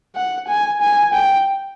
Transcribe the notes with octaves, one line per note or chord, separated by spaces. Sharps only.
F#5
G#5
G#5
G5